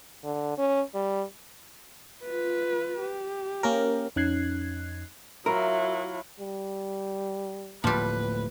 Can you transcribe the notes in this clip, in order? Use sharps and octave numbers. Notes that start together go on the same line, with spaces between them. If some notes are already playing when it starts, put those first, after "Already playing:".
D3
C#4
G3
F4 B4
G4
A#3 C#4 A#4
F2 C#4 D#4 F#6 G#6 C7
F#3 E4 F4 A#4
G3
D1 A2 F3 G3 A#3 B4